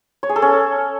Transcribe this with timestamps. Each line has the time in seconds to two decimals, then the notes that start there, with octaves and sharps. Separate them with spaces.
0.23 C#5
0.29 G#4
0.36 A4
0.42 C#4